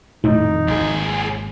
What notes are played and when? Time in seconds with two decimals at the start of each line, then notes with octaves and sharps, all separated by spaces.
0.24 D#1 F2 A2 G3 D#4
0.68 G#1 D#2 G#4